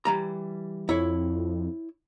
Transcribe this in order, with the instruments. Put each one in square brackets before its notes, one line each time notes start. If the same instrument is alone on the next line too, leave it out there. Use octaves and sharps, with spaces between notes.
[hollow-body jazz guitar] E3 G3 A#5
[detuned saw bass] F2 [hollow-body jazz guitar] E4 C#5